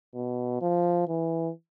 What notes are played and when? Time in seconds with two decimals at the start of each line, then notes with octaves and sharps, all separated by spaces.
0.15 B2
0.61 F3
1.08 E3